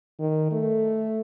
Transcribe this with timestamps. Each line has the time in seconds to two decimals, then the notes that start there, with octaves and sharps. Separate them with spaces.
0.19 D#3
0.52 A3